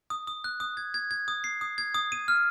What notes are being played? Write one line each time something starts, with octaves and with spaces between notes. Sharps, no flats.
D#6
D#6
F#6
D#6
G#6
G#6
G#6
D#6
C7
D#6
G#6
D#6
D#7
F6